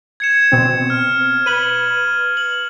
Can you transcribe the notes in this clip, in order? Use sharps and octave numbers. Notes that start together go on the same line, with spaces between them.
G#6 C#7 E7
B2 C4
F6
B4 D#7 F#7
F#7